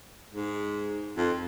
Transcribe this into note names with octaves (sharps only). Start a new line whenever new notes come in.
G#2
F2